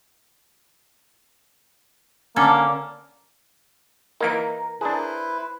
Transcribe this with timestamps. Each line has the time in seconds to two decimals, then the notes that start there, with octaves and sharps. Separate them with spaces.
2.36 D3 A#3 C#4 A4 A5 D6 G#6
4.20 E3 A#3 D#4 A#4 A#5
4.81 D4 E4 G#4 B4 C5